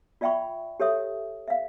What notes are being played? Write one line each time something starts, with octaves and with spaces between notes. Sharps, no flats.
F4 D5 E5 G5 B5 C#6
G4 A4 C#5 E5 D#6
E5 F5